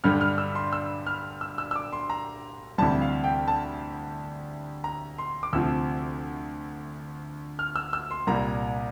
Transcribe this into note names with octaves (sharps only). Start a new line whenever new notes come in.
G2 D3 G3 F6
F6
E6
C6
E6
F6
E6
E6
E6
D6
C6
A#5
D2 C3 E3 G3 A5
F5
G5
A5
A#5
C6
D6
D2 C3 F3 E6
F6
E6
E6
C6
C2 A#2 G3 A#5